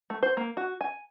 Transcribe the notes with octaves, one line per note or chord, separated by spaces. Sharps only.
A3
C5
A#3
F#4
G#5